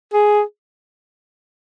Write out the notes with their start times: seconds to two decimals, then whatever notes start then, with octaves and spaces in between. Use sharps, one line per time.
0.13 G#4